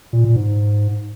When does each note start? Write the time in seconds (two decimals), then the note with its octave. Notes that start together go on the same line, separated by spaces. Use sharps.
0.13 A#2
0.24 A#2
0.36 G#2